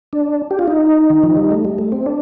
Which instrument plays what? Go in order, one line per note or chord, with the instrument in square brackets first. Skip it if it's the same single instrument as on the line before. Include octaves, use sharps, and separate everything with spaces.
[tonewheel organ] D4
G4
F4
D#4
D#3
F3
G3
A3
G3
A3
C4
D4